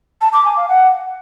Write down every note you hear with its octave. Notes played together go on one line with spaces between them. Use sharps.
A5
D6
G#5
F5
F#5